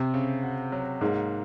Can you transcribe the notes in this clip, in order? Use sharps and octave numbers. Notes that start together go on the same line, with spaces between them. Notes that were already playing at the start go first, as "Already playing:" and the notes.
Already playing: C3 C4
C#3
F#4
F#3
G#2 A#3